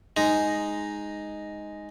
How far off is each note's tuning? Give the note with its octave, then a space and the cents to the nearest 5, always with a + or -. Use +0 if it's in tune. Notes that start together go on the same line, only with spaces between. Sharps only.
G#3 +0 D#4 +0